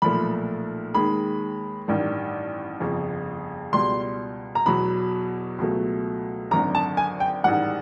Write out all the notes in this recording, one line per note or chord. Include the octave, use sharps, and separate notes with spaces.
B1 A#2 F3 A3 B5
D#2 D#3 G#3 B5
A1 G2 D#3 G3
G1 F2 C#3
C#2 B2 G3 C6
A#5
E2 B2 F#3 B5
C#2 B2 F#3 A3
G#1 F#2 D3 A#5
A5
G#5
G5
A1 G#2 D#3 G3 F#5